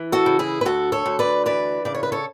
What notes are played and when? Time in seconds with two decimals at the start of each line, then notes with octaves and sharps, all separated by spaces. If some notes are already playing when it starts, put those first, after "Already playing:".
Already playing: E3
0.12 F#4 A4
0.26 C#3
0.39 E4 G#4
0.61 B4
0.65 D2 F#4 A4
0.92 A4 C#5
1.06 D2
1.19 B4 D5
1.46 E3 B4 D5
1.85 C#3 D5
1.95 C#5
2.03 B4
2.12 A4 C#5